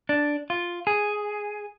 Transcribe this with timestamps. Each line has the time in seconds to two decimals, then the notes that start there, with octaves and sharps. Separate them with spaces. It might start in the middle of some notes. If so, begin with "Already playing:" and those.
0.09 D4
0.50 F4
0.87 G#4